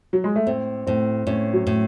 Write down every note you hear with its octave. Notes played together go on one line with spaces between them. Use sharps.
F#3
G#3
A3
A2 C4
A2 C4
A2 C#4
F#3
A2